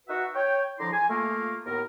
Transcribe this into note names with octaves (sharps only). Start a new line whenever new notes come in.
D#4 F#4 B4 E5 F#5
C#5 G5
D3 F3 E4 A#5 C6 D6
G#5
A3 A#3 F4
D#2 A2 B3 A#4